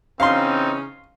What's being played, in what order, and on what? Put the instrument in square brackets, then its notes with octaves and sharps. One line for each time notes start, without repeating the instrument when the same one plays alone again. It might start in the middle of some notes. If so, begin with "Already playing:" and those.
[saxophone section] C#3 E3 C#4 [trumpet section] C4 D#4 [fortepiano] F5 C6